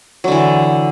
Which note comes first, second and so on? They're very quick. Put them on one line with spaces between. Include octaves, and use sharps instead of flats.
F#3 D3 E3